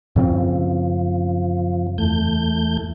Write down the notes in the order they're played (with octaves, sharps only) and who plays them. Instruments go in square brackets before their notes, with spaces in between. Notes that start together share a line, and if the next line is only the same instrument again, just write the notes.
[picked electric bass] F#2 C#3 C4 [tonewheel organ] F3
[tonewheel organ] E2 A3 G6